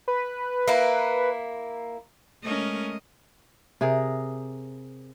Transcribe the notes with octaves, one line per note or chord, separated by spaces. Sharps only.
B4
A#3 E4
G#3 A3 C#4 A#4 D#5
C3 G#4 A#4